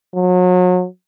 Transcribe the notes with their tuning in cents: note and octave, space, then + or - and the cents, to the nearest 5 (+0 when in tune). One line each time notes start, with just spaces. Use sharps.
F#3 -35